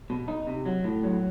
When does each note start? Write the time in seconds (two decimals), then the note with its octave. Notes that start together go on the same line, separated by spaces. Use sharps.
0.10 B2
0.28 D#4
0.47 C3
0.66 F#3
0.84 A2
1.03 F#3